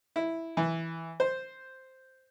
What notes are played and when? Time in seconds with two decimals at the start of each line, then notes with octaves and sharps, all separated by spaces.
0.16 E4
0.57 E3
1.20 C5